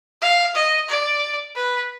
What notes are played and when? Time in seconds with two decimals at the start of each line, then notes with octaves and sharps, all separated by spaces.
0.22 F5
0.55 D#5
0.88 D5
1.55 B4